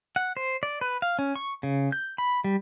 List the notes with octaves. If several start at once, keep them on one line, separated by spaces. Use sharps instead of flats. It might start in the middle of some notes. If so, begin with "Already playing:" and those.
F#5
C5
D5
B4
F5
C#4
C#6
C#3
G6
B5
G3